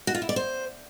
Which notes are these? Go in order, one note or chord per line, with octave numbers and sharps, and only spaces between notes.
F#4
F4
E4
D5
C5